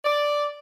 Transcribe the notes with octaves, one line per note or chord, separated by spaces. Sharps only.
D5